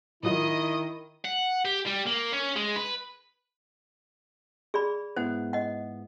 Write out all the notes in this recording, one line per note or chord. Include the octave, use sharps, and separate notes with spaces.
A2 D#3 F#3 E4 F4 D#5 D#6
F#5
G4
G3
A#3
C#4
G#3
B4
G#4 D5 B5
G#2 B3 E4 C5 F#5
D#5 F#5